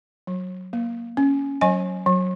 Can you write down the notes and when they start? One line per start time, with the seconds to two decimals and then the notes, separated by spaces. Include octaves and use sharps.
0.27 F#3
0.73 A#3
1.17 C#4
1.61 F#3 D#5 G#5
2.06 F#3